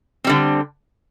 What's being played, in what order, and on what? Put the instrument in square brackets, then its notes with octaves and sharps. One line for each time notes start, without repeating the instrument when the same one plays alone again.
[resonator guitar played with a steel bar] D3 G3 C4